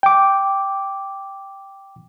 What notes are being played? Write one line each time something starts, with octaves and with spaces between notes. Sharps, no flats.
G5 D6